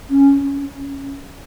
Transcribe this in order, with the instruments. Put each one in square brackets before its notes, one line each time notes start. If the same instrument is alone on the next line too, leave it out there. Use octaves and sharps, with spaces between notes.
[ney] C#4